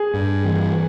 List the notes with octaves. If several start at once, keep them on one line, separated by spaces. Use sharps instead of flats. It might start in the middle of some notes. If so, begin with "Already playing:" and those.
Already playing: G#4
G2
E3